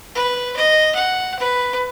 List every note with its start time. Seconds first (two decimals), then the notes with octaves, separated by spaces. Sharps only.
0.15 B4
0.56 D#5
0.95 F#5
1.39 B4